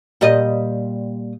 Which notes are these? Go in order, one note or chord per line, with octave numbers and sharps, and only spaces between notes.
A#2 G3 D#5